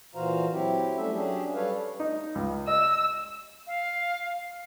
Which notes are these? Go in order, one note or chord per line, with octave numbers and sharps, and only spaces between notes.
A#2 E3 F#4 C5 F5 A#5
F#3 C4 E4 G4
G3 A3 C#4 A4 E5
F#3 C#4 D4 G4 G#4
G3 A4 B4 C#5 F5
D#4
C#2
D#5 E6
F5